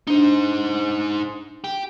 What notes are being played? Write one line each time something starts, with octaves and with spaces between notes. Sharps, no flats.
D4 D#4 C5
G4